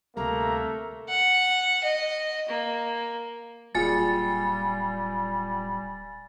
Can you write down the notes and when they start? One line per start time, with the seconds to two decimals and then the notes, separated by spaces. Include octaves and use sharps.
0.17 D2 C3 G3 A3 A#3 A#5
1.09 F#5
1.83 D#5
2.49 A#3
3.75 D1 A#2 G3 F4 G#4 G#5 A6